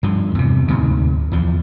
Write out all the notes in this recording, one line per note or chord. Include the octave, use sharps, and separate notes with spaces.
G2 F3
E2 C3
D2 G#2 C3
E2 F3